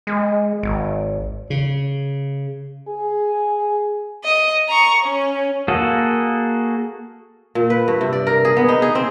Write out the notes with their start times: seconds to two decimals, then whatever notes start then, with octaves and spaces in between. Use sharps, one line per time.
0.07 G#3
0.63 G#1
1.50 C#3
2.88 G#4
4.24 D#5
4.68 A#5 C#6
5.03 C#4
5.68 A#3 F#4 G#4 A4
7.55 A#2
7.70 B4
7.88 G2
8.01 C3
8.13 D5
8.27 A#4
8.45 G#4
8.57 B3
8.69 D#4
8.82 G#4
8.95 C4